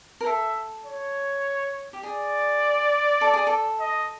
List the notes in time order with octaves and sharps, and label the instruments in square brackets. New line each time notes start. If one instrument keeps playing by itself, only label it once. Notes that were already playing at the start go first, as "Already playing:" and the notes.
[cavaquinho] A#4
[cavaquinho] A4 [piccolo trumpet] E5
[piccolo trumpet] C#5
[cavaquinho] G4
[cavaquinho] G#4 [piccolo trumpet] D5
[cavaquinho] A4
G#4
A4
[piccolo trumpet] D#5